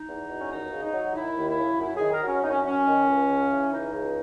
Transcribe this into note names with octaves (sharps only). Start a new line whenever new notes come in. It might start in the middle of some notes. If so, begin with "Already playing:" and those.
Already playing: D#4
E2
B2
C#4
D#2 D#4
C#3
D#4
F#3
D#2 E4
D#2
E4
C#3
F#2 E4
D#3 G#4
A#4
F#3 C#4
F#2 D#4
C#4
F#2 C#4
D#3
C#2
C#3
E3
C#2 D#4
C#2